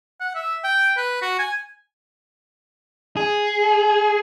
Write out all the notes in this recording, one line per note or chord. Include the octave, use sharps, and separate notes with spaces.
F#5
E5
G5
B4
F#4
G#5
G#4